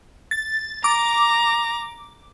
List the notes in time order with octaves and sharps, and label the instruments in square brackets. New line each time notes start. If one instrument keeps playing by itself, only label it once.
[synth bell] A6
[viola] A#5 [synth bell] D6